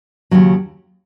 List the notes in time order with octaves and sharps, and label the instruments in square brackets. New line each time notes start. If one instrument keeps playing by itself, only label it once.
[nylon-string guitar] D#2 C#3 F#3